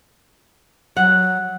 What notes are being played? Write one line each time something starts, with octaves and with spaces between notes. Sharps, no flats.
F#3 F#5